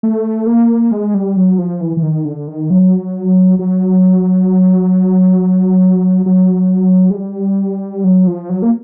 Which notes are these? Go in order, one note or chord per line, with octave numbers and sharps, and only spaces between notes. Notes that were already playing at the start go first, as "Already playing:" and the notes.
A3
A#3
G#3
G3
F#3
F3
E3
E3
D#3
D3
D#3
F#3
F#3
F#3
G#3
G3
F#3
F3
F#3
A#3